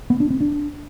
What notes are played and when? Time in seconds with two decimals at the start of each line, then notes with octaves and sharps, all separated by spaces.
0.10 B3
0.20 D4
0.30 C4
0.40 D4